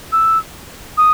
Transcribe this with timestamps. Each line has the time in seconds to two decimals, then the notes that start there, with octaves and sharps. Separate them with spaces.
0.12 E6
0.97 D#6